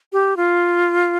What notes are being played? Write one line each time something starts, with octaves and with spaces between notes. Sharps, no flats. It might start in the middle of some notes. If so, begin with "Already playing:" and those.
G4
F4